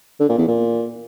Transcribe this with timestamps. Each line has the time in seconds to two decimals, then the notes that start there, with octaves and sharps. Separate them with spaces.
0.20 D3
0.29 A#2
0.38 E2
0.47 A#2